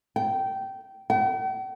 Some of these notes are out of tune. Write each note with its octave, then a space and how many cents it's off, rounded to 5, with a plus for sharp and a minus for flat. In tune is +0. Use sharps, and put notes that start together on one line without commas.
G5 -15
G5 -45